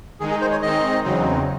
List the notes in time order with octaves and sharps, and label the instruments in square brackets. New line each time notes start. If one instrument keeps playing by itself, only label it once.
[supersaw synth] D#3 G#3 D#4 [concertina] G#4
[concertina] G#4
C5
C#5
[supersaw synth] D#3 G#3 C4 D#4 [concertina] D#5
[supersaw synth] E2 C#3 F#3 C4 D#4